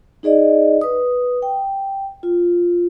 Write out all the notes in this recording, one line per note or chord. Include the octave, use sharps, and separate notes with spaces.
D#4 G#4 D5 D#5
B4 D#6
G5
F4